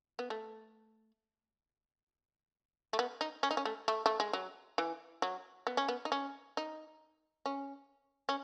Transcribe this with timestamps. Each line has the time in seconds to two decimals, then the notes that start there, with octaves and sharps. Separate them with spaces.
0.19 B3
0.30 A3
2.93 A3
2.99 B3
3.21 D#4
3.43 C#4
3.51 D#4
3.57 C#4
3.65 A3
3.88 A3
4.06 A3
4.20 G#3
4.33 F#3
4.78 E3
5.22 F#3
5.67 B3
5.77 C#4
5.88 B3
6.05 D#4
6.12 C#4
6.57 D#4
7.46 C#4
8.29 C#4